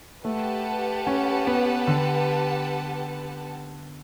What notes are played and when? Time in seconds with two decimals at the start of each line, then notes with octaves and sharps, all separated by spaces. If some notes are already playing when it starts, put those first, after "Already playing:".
0.24 A3 G4 B4 F#5 A5
1.07 C#4
1.47 B3
1.87 D3